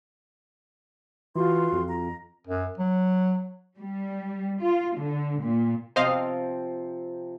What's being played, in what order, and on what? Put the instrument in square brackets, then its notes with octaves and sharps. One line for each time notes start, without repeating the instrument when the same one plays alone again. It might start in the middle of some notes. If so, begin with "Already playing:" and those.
[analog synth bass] E3 [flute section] F4 F#4 C6
[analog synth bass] F2
[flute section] A#5
[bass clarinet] F#2
F#3
[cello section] G3
F4
D3
A#2
[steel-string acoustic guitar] C3 F3 C4 [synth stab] C5 D#5 F5